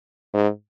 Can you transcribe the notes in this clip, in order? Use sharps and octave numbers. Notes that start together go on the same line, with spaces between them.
G#2